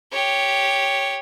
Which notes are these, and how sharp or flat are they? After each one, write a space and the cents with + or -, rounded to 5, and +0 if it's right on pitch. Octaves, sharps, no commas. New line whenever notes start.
G4 +0 C#5 +0